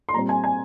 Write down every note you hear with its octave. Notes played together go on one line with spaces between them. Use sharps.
C6
A#2 G3 C4 A#5
G#5
G#5